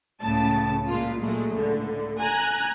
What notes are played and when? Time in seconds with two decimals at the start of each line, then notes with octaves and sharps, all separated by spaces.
0.22 C#2 A2 C#3 A5
0.87 A#2 G#3 A#3 F4
1.20 A#2 F#3 G#3 A3
1.54 C#2 A2 D3
2.17 G#5 A#5 F#6